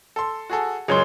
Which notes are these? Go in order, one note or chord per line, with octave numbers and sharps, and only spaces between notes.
A4 C6
F#4 G#4 A4
C#2 F#2 A#2 G#4 C#5 C6